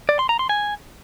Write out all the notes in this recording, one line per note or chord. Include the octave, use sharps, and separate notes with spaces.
D5
C6
A#5
C6
G#5